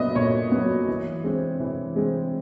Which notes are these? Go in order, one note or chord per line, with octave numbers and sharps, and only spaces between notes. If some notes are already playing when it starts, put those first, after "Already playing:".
Already playing: A#2 F#3 B3 D#5 E5
A#2 C#5
F#3 B3
E3
G#3 C4
E3
G#3 C4